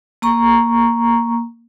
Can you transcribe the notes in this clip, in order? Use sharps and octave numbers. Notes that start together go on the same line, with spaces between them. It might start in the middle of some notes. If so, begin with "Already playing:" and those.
A#3 A#5 C#6